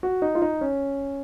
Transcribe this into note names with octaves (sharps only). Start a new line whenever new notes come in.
F#4
D#4
F4
D#4
C#4